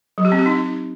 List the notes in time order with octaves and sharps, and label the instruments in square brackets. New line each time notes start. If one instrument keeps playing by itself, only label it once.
[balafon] F#3
G4
C4
G4
D#4